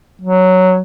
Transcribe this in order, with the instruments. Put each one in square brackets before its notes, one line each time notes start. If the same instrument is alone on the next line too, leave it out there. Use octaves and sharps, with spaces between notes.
[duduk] F#3